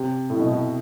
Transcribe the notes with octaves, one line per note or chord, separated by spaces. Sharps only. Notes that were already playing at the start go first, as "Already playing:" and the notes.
Already playing: C3
A2
B2
A2